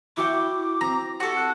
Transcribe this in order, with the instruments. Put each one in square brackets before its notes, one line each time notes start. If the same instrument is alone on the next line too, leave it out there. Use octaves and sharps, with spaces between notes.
[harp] E4 F#4 G5 [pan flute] D6
[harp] C4 [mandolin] A#5
[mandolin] F#4 A4 [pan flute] G4 [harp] C#6
[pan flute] F#6